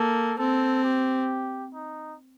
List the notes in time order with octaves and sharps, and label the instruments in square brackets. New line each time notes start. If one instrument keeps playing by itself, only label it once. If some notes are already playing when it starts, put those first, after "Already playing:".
Already playing: [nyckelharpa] A#3 [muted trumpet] A4
[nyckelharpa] C4 [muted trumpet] A4
[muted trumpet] G4
D#4